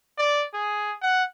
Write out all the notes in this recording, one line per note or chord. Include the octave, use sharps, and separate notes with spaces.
D5
G#4
F#5